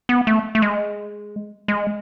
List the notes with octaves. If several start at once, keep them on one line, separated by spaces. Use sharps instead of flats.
B3
A3
A3
G#3
G#3